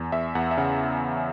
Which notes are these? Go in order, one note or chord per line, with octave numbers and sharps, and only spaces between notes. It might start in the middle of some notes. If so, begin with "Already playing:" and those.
Already playing: E2
E2 E5
E2 F#5
E5
C#3 F#5